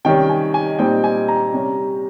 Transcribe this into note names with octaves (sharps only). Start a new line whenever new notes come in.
C3 D#3 G3 C#4 G5
G#5
G#5
A#2 G3 C4 D#4 G5
G#5
A#5
C3 G3 C#4